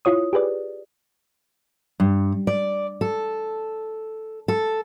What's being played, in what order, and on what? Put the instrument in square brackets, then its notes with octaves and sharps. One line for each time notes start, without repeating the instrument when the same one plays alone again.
[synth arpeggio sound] E4 F4 C#5 D#6
G4 G#4 B4 D5
[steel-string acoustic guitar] G2
D5
A4
A4